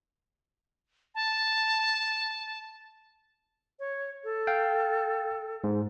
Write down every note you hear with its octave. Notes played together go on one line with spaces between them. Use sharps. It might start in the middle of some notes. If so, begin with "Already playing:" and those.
A5
C#5
A4
F5 G5
G#2